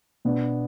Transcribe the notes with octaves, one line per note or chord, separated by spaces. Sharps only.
B2 B3 D4